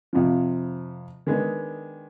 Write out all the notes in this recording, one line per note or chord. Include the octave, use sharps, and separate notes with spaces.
F2 C3 F3
D#3 G#3 B3 D4